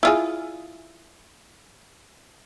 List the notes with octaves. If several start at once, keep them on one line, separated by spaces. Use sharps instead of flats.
E4 F4 G#4